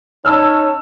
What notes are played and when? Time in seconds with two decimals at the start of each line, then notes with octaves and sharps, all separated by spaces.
0.25 C#4 D#4 C#5 A5 E6 F6